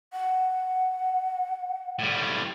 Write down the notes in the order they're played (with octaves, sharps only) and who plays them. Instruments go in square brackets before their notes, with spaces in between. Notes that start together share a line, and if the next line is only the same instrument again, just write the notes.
[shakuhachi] F#5
[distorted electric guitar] A2 G3